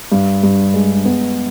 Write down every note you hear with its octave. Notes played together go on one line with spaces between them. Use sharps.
G2
G2
G#3
B3